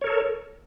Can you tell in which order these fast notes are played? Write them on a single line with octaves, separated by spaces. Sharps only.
C#5 A#4 A4